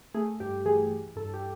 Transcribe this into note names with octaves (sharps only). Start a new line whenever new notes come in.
A3 G#4
G2 G4
E3 G#4
E3
G2 A4
G4